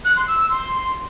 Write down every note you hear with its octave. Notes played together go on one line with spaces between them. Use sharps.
F#6
C6
E6
E6
C6